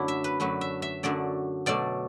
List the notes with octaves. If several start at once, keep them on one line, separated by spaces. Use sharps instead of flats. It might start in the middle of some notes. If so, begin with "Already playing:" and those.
Already playing: F#2 D3 F#3 A3 D4 E4
E5
B4
F#2 D3 F#3 A3 B4
E5
E5
F#2 D3 F#3 A3 D5
B2 F#3 A3 D5